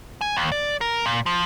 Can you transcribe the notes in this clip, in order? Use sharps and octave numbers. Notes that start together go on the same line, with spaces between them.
G#5
D#2
D5
A#4
A#2
F3